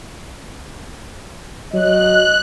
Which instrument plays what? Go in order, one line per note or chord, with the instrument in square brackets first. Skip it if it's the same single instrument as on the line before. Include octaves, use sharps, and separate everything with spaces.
[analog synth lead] F#3 [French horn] D#5 [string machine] F#6